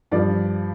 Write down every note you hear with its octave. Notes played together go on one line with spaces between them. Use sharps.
G2 F3 D5